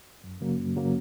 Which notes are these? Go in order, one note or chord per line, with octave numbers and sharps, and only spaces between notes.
F#2
C#3 F#3 A#3
F#2
C#3 F#3 A#3